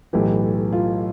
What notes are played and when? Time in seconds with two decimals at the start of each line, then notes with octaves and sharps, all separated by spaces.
0.13 B1 A2 E3 G4
0.73 F4